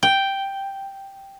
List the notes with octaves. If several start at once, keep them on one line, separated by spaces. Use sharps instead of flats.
G5